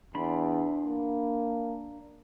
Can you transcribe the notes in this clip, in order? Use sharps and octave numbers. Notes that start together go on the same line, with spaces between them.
E2 D4 B5 C6
A#3